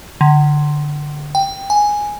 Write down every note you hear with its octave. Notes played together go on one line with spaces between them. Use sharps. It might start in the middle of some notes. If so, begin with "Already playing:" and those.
D3
G5
G#5